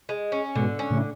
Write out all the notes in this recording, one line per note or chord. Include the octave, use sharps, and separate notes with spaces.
G#3
C#4
G#2 B2 D3
C#4
A2 C#3